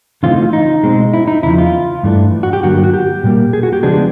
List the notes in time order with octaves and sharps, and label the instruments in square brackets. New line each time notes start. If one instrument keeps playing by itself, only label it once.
[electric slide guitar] C#3 E3 A3 C4 D#4 F4
F4
D#4
B2 G#3 C4
E4
D#4
E2 C#3 F3 E4
F4
G2 E3 A3 D4
F#4
G4
G2 D3 F#3 A#3 F#4
F#4
G4
A#2 G3 A#3
G#4
F#4
G4
C#3 F3 G#3 B3 D4 G#4